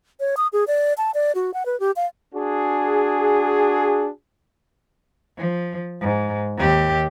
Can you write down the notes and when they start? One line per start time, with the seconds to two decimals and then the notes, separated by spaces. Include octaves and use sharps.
0.20 C#5
0.37 D#6
0.53 G#4
0.67 D5
0.98 A5
1.14 D5
1.35 F#4
1.54 F#5
1.66 B4
1.80 G4
1.96 F5
2.34 D4 F#4 G#4
5.38 F3
6.01 G#2
6.57 D#2 G4